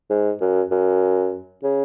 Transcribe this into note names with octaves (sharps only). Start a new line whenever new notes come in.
G#2
F#2
F#2
C#3